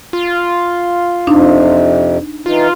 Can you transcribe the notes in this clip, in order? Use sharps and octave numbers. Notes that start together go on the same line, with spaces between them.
F4
F2 C3 D4 D#4
E3 D#4 F4